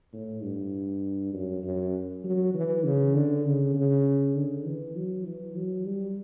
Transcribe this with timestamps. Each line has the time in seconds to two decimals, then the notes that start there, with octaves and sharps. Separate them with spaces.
0.13 A2
0.43 G2
1.34 F#2
1.64 F#2
2.24 F#3
2.54 E3
2.84 C#3
3.15 D3
3.45 C#3
3.75 C#3
4.35 D3
4.65 E3
4.96 F#3
5.25 E3
5.56 F#3
5.86 G3